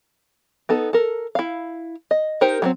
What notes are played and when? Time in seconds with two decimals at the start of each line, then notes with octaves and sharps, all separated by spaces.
0.69 B3 D#4 A4
0.93 A4 A#4
1.35 E4 F5
2.11 D#5
2.41 D#4 G4 A#4 C5
2.62 F#3 A3 C4